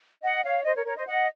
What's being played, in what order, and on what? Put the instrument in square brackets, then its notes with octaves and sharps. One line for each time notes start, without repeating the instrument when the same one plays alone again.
[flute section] D#5 F#5
C#5 F5
C5 D#5
A#4 C#5
A#4 C#5
C5 D#5
D#5 F#5